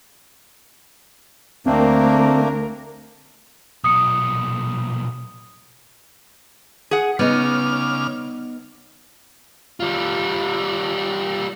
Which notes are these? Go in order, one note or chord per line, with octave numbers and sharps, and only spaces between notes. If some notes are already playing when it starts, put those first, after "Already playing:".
D2 A3 A#3 C4 D4 A#4
B1 A#2 D#6 C#7
G#4 F#5
C#3 G3 B3 D#4 D6 F6
G3 F4